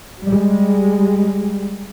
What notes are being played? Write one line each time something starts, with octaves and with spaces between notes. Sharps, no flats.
G3 G#3